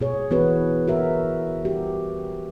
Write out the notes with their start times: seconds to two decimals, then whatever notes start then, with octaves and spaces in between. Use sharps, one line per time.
0.01 B2 G#4 C#5
0.31 E3 B3 F#4 G#4 B4 C#5
0.88 F#4 A#4 E5
1.65 F#4 G4